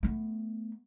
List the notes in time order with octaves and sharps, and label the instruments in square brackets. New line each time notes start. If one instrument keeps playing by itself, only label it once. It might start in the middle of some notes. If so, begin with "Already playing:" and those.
[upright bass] A3 B3